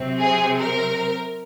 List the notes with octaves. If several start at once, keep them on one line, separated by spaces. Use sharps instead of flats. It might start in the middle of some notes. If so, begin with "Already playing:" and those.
Already playing: C3 F#3 C4
G#4
A#4